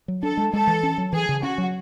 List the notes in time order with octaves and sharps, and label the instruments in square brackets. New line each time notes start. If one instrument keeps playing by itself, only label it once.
[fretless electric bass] F#3
[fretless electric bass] D4 [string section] A4
[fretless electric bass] G#3
[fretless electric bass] G#3 [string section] A4
[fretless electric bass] E3
C#4
F#3
[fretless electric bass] E3 [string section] G#4
[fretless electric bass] C#3
[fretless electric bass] C#4 [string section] F#4
[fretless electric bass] F#3